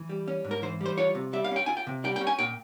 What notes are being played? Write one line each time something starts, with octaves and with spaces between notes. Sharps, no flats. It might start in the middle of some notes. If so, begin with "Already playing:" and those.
Already playing: E3
G3
C#4
G#2
A#4
E3 C5
G3 C5
F4 C#5
C3
G3 E5
F5
C#4 G5
F4 G#5
G5
C3
G3 G5
G5
C#4
G#5
A#2 G5